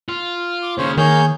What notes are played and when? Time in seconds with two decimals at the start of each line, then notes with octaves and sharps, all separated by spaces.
0.09 F4
0.62 D6
0.78 D#2 C#3 C5 C#5
0.98 D#3 A#3 G#4 C#5 G6